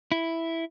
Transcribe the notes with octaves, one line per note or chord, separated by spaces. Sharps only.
E4